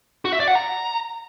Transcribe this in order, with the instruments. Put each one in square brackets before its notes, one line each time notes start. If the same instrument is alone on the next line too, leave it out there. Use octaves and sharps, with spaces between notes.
[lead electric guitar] F#4
E5
D5
F#5
A#5